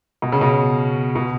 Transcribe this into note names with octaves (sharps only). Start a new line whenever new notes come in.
B2
C#3
B2
B2